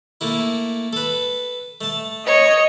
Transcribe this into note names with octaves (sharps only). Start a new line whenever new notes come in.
A3 A#3 E4
A4 B4
A3 A5
C#5 D#5